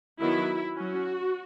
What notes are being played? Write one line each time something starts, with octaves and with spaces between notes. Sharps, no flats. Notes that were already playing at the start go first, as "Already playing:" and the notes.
D#3 F#3 B3 E4
F#3 C#4 F#4